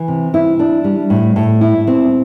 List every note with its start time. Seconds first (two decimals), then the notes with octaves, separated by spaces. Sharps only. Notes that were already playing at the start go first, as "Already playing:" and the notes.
Already playing: E3
0.08 C3
0.34 E4
0.59 D4
0.84 G3
1.10 A2
1.36 A2
1.61 E4
1.87 C4